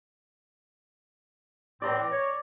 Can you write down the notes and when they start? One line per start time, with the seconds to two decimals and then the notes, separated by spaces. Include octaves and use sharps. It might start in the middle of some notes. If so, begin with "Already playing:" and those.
1.82 A2 E3 C4 D5 A#5 D6
2.11 C#5